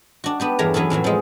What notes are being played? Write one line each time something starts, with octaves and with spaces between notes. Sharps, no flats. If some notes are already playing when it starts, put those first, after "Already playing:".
D4 F#4
B3 D4 G4
E2 G2 A3 A#4 C#5 A#5
E3 F#3 B3 C#4 A4
F2 A2 E3 F#3
F3 G#3